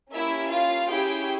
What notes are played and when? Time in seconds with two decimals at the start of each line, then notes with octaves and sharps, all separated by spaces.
0.13 A#3 C#4 E4 G4 E5
0.51 F4 F5
0.90 C#4 E4 G4 G#4 G5